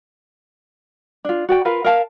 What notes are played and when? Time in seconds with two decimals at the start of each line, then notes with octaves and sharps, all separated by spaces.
1.25 D4 F4
1.49 F#4 D5 G5
1.65 F4 A#4 B4 F5
1.84 A#4 E5 F5 A5